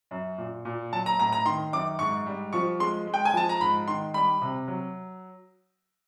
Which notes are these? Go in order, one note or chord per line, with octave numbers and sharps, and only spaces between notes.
F#2
A#2
A#2
F#3 A5
A#5
A2 A#5
A#5
D#3 C6
F#2 D6
G#2 C#6
G3
F3 C#6
G#3 C6
G#3
G5
G#5
F3 A5
A#5
G#2 B5
D#3 C6
G3 B5
C3
F#3